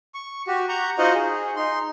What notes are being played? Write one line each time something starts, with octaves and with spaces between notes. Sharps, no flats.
C#6
F#4 G4
F#5 A#5 C#6 G6
D#4 F4 F#4 C5 D#5 F#5
G#4
D#4 C6